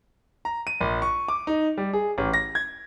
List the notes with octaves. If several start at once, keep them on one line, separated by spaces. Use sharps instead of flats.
A#5
D#7
A#1
C#6
D6
D#4
G3
G#4
A1
A#6
G#6